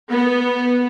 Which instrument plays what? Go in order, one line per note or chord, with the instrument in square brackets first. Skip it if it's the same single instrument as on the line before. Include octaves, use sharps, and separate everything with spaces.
[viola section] B3